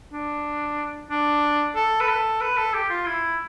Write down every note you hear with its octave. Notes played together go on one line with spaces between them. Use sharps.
D4
D4
A4
B4
A4
B4
A4
G4
F4
E4